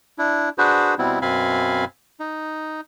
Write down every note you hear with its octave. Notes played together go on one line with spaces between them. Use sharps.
D4 E4
D4 F#4 G#4 B4 C5
B2 G3 B3 C4 E4
F#2 B2 C4 F5 G#5 B5
D#4